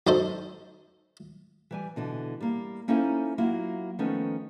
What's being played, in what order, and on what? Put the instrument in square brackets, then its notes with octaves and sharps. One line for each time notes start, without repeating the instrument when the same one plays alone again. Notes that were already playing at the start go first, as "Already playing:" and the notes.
[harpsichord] F#2 D#4 A4 C5
[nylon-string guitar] E3 G3 G#5
B2 D3 E3
G3 A#3
A#3 C#4 D#4 E4 A4 C5
F#3 A#3 E4 F4
D#3 F3 A3 B3 C#4 D#4